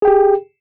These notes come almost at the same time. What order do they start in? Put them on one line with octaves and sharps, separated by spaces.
G#4 G5 G4